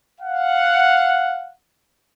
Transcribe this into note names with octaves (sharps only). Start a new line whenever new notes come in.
F5 F#5